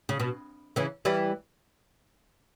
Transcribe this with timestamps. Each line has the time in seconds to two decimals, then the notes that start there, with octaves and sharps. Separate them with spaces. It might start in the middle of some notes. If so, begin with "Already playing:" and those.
0.09 C#3
0.20 B2
0.76 C#3 E3
1.05 E3 G3